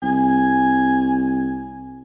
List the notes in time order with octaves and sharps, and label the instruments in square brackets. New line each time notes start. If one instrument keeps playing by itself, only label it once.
[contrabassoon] C2 [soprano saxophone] G#5